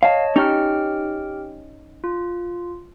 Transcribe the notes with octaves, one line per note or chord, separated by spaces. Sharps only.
C#5 D#5 F5 A5
C#4 D#4 G4 G5 F6
F4